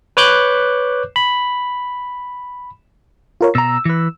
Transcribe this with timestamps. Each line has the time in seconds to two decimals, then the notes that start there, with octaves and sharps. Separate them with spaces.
0.17 B4 C#5 D6 F#6 G6
1.16 B5
3.41 F4 A#4 C#5
3.55 B2 A#5 E6
3.85 E3 B4